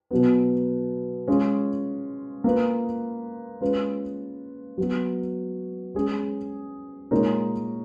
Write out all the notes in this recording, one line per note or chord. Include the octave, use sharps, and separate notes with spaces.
B2 F#3 B3
G#3 C#4 F4
A#3 F4 B4
G#3 C#4 F4 B4
F#3 B3 F#4
G#3 C#4 G#4
A#2 G#3 D#4 A#4 C#5